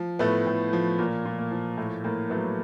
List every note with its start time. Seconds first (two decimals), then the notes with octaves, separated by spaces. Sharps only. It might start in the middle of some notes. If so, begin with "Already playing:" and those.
Already playing: F3
0.19 A2 A3 B3
0.47 A2
0.73 F3
0.99 A#2 A#3
1.25 A#2
1.39 A#3
1.52 F3
1.77 A2 A3
2.04 A2 A#3
2.30 F#3 A3 B3